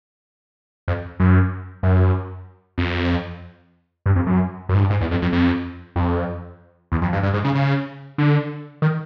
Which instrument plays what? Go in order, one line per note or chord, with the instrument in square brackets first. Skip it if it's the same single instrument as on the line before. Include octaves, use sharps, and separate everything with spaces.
[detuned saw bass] F2
F#2
F#2
F2
G2
F2
F#2
F#2
G#2
G2
G#2
E2
F2
F2
F2
F2
E2
F2
G2
G2
G#2
C#3
C#3
D3
D#3